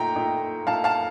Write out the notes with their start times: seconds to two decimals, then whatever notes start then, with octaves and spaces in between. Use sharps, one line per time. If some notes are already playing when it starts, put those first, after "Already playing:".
Already playing: A#2 A3 D#4 G5 A#5
0.16 A#2 A3 D#4
0.67 A#2 A3 D#4 F5 A5
0.84 F5 A5